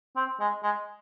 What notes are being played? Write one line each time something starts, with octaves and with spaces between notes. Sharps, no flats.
C4
G#3
G#3